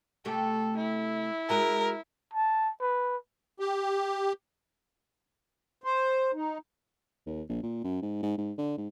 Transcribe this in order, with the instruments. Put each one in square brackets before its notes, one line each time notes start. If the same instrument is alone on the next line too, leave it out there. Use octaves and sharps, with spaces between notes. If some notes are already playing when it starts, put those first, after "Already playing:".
[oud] C3 A3 G4 [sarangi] A4
[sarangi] E4
[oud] G#3 F#4 G#4 [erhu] A#4
[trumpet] A5
B4
[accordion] G4
[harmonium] C5
D#4
[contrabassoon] D#2
A#1
A#2
F#2
G#2
G#2
G#2
D3
G#2